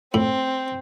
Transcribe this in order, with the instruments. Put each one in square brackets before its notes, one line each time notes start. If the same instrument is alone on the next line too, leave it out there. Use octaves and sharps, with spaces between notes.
[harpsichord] A2 [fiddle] C4